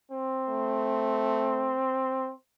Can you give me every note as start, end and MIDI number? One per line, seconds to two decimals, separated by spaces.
0.11 2.34 60
0.49 1.82 57